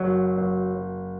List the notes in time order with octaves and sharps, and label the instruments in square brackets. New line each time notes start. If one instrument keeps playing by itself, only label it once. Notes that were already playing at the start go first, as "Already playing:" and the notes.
Already playing: [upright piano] F#1 [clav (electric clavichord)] F#3
[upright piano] F#1